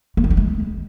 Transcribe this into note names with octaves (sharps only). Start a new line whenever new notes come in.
A#3
D#3
F#3
G#3